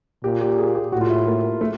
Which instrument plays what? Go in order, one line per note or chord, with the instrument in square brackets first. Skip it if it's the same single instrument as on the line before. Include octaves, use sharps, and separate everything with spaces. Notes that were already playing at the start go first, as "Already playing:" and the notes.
[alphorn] A#2 [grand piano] G4
[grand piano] G4
G#4
G4
[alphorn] A2 [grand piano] F#4
[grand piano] F4
E4
A#3
A3